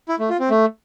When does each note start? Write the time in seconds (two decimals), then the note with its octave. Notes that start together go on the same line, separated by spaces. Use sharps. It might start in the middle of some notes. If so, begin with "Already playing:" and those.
0.09 E4
0.19 A3
0.29 F4
0.40 C4
0.50 A3